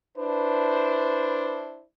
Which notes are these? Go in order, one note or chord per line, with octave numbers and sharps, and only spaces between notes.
D4 E4 B4 C5